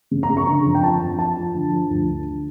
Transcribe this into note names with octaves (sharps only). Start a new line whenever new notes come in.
C#3
A#5
C#3
C#6
D3 A#5
F2
G5
F3 A5
F2
F3 A5
F3
D3
F3
D2
D3